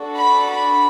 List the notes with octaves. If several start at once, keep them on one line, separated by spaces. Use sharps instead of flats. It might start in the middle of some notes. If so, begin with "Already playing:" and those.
Already playing: D4 F#4 A4
B5
B5